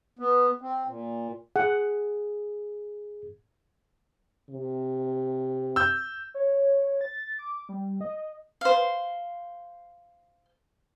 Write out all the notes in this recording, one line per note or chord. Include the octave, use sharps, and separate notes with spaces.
B3
C4
A#2
G#4 F#5
C3
E6 G6
C#5
A6
D6
G3
D#5
C5 F5